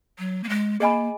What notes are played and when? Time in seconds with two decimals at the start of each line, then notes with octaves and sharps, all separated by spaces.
0.19 F#3
0.44 A#3
0.49 G#3
0.80 A#3 G#4 D#5 G#5 B5